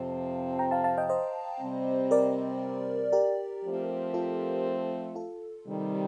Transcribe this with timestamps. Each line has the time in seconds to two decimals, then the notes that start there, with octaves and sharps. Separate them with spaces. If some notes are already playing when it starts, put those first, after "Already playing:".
Already playing: F2 C3 F3 C4 F5 A5
0.59 G5 A#5
0.71 F5 A5
0.84 F5 A5
0.98 D#5 G5
1.09 C5 D#5
1.61 C3 G3 C4
2.11 A#4 D5
3.12 G4 A#4
3.63 F3 A3 C4
4.14 F4 A4
5.15 F4 A4
5.66 C3 D#3 G3